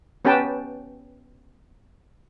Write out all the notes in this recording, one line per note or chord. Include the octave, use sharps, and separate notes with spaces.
B3 C#4 G4 B4 G5 A5